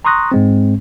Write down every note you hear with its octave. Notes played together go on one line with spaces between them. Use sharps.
A#5 C6 C#6 D#6 F#6 A#6
G#2 G#3 C4